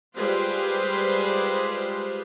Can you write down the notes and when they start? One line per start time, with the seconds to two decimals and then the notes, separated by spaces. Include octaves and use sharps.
0.17 G3 G#3 F4 G#4 B4 C5